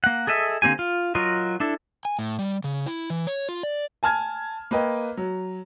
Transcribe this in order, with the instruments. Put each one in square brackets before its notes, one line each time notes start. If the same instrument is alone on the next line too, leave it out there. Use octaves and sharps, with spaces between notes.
[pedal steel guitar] A#3 F#5
G#4 A4 D#5 E5
D3 A#3 C4 G4 G#5
F4
F#3 F4 F#4 A#4 D#5
D4 E4 A4
[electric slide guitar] G#5
A2
G3
C#3
E4
E3
C#5
F4
D5
[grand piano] G#5 A5 F6 G#6
A#3 B4 D#5 G5
F#3